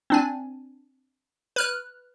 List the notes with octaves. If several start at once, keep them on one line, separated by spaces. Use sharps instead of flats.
C4 D4 G#5
B4 F6 F#6